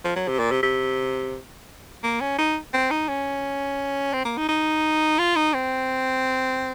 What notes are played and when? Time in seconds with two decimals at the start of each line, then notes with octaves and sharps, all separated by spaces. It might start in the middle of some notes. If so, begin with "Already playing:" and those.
0.05 F3
0.16 F#3
0.28 C3
0.39 A#2
0.51 C3
0.63 C3
2.04 A#3
2.21 C#4
2.38 D#4
2.73 C4
2.91 D#4
3.08 C#4
4.13 C4
4.25 A#3
4.38 D#4
4.48 D#4
5.19 F4
5.36 D#4
5.53 C4